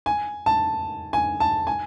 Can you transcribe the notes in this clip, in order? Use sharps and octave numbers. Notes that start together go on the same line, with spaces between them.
G#5
A5
G#5
A5
G#5